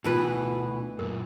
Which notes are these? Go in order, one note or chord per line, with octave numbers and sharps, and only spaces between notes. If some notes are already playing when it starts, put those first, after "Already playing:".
D2 B2 E3 D#4 F4 G4 B4
F#2 A#2 A#4